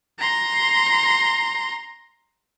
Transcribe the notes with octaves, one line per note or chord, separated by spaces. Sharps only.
A#5 C6